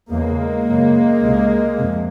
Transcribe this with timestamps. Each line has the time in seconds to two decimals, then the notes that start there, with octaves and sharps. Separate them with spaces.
0.10 E2 C#3 G#3 A#3
0.66 F#2 C#3
1.22 C#2 C3
1.78 F2 C3